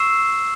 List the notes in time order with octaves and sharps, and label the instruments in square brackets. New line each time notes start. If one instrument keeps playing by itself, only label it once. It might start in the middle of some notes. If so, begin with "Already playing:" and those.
Already playing: [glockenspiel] C#6 E6 C7 E7